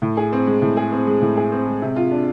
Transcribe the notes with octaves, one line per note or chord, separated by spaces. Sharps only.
A2
G#4
C4
G#3
A2
G#4
C4
G#3
A2
G#4
C4
G#3
C3
F4
D4